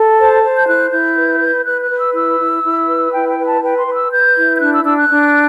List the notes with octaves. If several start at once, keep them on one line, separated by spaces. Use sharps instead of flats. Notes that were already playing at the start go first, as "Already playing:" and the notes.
Already playing: A4
C5 A5
C5
G6
E4 F#6
E4 G6
B4
B4
B4 F#6
F#6
B4
E6
E4 E6
E4
E4
B4
E4 G5
G5
B4
A5
B4 G5
C6
B4
E6
B4 G6
E4
G6
D4 F#6
E6
D4 E6
F#6
D4